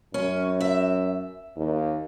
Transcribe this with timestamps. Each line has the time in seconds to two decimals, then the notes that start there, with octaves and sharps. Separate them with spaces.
0.14 F#2 C#4
0.61 E5
1.57 D#2